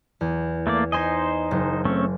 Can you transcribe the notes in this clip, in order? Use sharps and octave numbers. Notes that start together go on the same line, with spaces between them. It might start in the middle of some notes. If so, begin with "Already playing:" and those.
E2
A3 A#3 D5
D#4 C5 D#5 G#5 C6
F#1
A3 C4 C#4